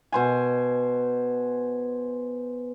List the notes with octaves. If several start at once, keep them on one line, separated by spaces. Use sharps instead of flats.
B2 C5 G#5